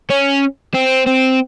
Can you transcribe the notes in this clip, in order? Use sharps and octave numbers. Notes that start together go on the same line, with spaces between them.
C#4
C4
C4